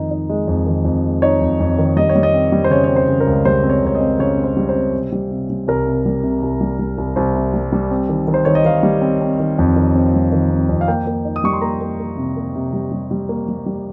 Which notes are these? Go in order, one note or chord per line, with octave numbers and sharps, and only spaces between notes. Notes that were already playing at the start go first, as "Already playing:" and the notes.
Already playing: F2 D#3 G#3 D#4
D#4
G#3
F2
D#3
F2
G#3
D#4 C#5
F2
F2
D#3
G3 D#5
C#5
G3
D#5
C4
G3
C5
C#3 C#5
C#5
C4
C5
C#3
A#4
C#2
G3 C5
C4
C#5
C#2 C#5
D#5
C4
C#3 C#5
C4
C5
G3
C5
C4
C3
G3
C3
G3
C2 A#4
C3
G3
C3
C2
G3
G3
C2
C2 C5
C3
G3
G3
C4
D#3
D#3
C5
D#3 C#5
D#5
D#3 F5
G3
C4
C4
D#3
F2
D#3
C4
G3
D#3
C4
F2
F5
A#3 G5
A#3
D#4
D#6
G3 C#6
C6
A#3 A#5
A#3
A#3
C3
A#3
C3
G3
G3
G3
A#3
G3
G3